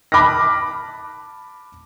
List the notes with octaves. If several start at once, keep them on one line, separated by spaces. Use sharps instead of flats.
A5 B5 D6 F6 F#6 A#6